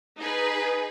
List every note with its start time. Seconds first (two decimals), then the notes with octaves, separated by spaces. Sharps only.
0.18 D#4 G#4 B4